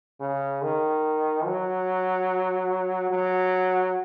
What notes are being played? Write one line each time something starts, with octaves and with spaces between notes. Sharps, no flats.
C#3
D#3
F#3
F#3